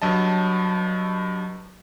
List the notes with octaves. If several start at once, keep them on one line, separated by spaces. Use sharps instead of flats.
G2 F#3 D#5 A5